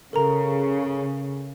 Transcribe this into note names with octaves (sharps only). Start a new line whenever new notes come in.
C#3 A4 A#4 A#5